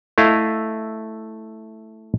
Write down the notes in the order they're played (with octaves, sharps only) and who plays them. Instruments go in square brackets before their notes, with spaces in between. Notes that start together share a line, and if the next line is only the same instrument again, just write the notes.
[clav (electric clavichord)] A3 E4 D#5 F5